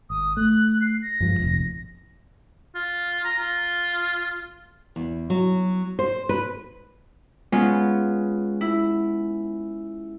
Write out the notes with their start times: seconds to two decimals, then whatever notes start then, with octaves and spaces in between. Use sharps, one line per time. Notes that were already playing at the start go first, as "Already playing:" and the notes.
0.10 G#1 D#6
0.37 A3 F#6
0.82 C7
1.02 A#6
1.20 G2 F3 G#3
1.40 F1 A#1 F2
2.75 F4
3.25 A#5
3.39 F4
4.96 E2
5.30 F#3
5.99 C5
6.29 B4
7.52 G#3 B3 C#4 F4
8.61 E4